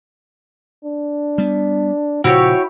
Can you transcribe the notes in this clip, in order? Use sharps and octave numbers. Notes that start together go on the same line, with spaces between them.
D4
G3 B3
A#2 C#3 F3 E4 F#4 G4 C#5